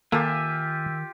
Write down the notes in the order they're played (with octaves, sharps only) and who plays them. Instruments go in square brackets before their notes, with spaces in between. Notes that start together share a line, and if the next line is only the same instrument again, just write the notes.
[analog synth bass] D#3 [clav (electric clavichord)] A#3 A4 [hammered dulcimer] F4 G4 [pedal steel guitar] E5 G#5